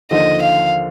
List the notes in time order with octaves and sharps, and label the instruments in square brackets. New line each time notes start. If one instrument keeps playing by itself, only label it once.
[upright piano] D#2 D3 F3 [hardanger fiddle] D#5
[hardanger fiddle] F5